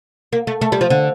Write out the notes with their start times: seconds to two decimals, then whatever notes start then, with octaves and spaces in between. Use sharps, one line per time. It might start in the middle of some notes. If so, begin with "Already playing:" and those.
0.32 A#3
0.47 A3
0.61 A3
0.72 G3
0.81 F3
0.90 D3